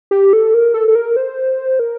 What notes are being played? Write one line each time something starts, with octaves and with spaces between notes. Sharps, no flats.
G4
A4
A#4
A4
A4
A#4
C5
A#4